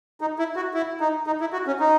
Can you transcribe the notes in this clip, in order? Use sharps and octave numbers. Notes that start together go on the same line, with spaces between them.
D#4
E4
F#4
E4
D#4
D#4
E4
F#4
C#4
D#4